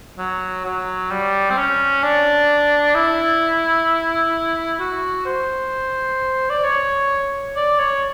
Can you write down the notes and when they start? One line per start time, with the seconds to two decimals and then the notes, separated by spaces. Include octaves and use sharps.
0.18 F#3
0.65 F#3
1.11 G3
1.50 C4
1.58 C#4
2.03 D4
2.95 E4
4.80 F#4
5.26 C5
6.50 D5
6.64 C#5
7.57 D5
7.79 C#5